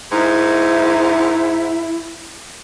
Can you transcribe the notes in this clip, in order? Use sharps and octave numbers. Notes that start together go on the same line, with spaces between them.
G#2 E4